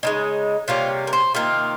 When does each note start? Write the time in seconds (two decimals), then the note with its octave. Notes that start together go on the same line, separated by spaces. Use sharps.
0.03 C#3 F3 G#3 D#4
0.68 C3 G3 A#3 C#4 F4
1.07 A#4
1.13 C5
1.34 C3 D#3 A#3 F4